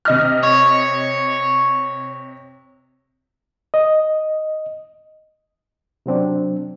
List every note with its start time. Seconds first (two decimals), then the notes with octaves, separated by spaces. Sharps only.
0.05 C3 D#5 F6
0.43 C#5
3.74 D#5
6.06 C3 F#3 C4 D4